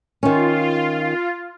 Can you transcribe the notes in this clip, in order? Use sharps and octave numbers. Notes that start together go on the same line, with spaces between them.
D#3 C#4 F4